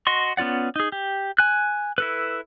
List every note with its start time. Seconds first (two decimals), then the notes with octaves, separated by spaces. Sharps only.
0.07 F#4 D#5 C6 C#6
0.37 B3 C#4 F4 D5 F#5
0.76 D#4 G#4
0.92 G4
1.39 G#5 F#6
1.98 E4 A4 B4